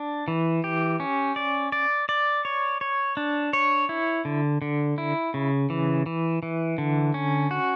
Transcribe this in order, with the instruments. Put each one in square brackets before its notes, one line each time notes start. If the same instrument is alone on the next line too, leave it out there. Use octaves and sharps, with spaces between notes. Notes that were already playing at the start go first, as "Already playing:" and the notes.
Already playing: [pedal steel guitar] D4
E3
G4
C#4
D5
D5
D5
C#5
C#5
D4
C#5
E4
D3
D3
E4
C#3
E3
E3
E3
D3
C#4
F#4